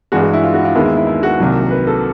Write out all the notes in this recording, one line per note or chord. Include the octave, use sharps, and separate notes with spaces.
G2 E3 G#3 F#4
F#4
E4
F4
F#4
F4
D#2 D#3 G#3 B3 E4
E4
E4
E4
F#4
C2 C3 D#3 F#3 A#3
B4
A4